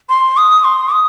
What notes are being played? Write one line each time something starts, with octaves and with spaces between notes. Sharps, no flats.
C6
D#6
C6
D#6